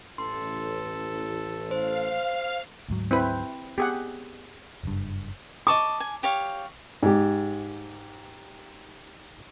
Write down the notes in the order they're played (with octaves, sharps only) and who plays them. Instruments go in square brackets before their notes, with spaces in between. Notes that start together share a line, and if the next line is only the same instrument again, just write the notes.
[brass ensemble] A1 [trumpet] A4 [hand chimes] C6
[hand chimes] C5 [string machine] F5
[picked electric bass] D2 G#2 F#3
[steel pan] C4 E4 B4
[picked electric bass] B3 [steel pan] G4 G#4 F#5
[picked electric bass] F#1 G2
[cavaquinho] D#5 A5 C#6 [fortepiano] D6
[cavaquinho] G#5
G4 C#5 F5
[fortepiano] G#2 G4